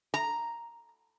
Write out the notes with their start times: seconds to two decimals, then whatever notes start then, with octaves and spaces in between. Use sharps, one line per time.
0.14 A#5